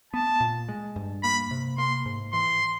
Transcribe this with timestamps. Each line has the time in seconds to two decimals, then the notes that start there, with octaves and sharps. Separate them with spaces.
0.13 B3 A5
0.40 A#2
0.68 G#3
0.96 G2
1.24 A#3 B5
1.51 C3
1.78 A#3 C6
2.06 G#2
2.33 E3 C6